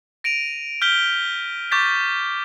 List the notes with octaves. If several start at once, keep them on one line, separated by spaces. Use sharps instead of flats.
A#6 D7 D#7 F7
F6 G6 B6 G7
C#6 D6 G6 A6 B6